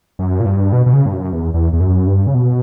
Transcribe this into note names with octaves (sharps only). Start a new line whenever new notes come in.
F#2
A#2
G2
B2
B2
C#3
G2
F#2
E2
E2
E2
F#2
G2
C#3
B2